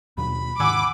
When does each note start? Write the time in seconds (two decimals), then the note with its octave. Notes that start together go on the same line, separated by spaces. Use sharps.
0.17 D#2 B2 F#3 B5
0.60 G#2 C3 D#3 F#5 G#5 D6 E6